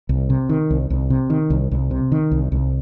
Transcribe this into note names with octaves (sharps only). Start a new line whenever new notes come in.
C2
C3
D#3
C2
C2
C3
D#3
C2
C2
C3
D#3
C2
C2